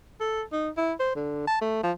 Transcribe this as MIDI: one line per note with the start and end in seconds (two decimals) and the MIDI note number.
0.21 0.43 69
0.52 0.70 63
0.77 0.93 64
1.00 1.14 72
1.16 1.45 50
1.47 1.57 81
1.61 1.79 57
1.83 1.92 53